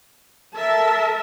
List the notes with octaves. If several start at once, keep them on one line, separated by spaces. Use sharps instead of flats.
A4 A#4 E5 A5